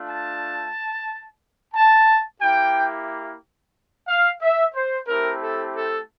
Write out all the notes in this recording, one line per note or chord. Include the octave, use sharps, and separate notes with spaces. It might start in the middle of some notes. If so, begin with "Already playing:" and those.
Already playing: A3 D4 F4
A5
A5
A#3 E4 G4 G5
F5
E5
C5
A3 C4 E4 G4 A#4
A4
A4